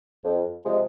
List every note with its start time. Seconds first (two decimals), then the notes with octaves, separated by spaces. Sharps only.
0.23 F2
0.64 C3 F3 G#3